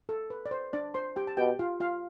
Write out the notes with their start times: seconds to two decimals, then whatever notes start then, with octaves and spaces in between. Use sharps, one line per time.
0.09 A4
0.30 B4
0.46 D5
0.51 C5
0.73 D4 D5
0.94 C5 C6
1.16 G4 G5
1.27 A5
1.37 B2 G4 G5
1.59 F4 F5
1.80 F4 F5